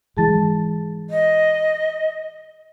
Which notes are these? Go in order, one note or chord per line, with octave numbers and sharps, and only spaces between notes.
G#2 E3 G#3 G#4 A5 A6
D#5